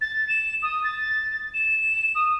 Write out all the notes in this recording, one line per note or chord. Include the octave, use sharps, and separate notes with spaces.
A6
E7
D#6
A6
E7
D#6